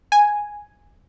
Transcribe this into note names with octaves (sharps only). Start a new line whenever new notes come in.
G#5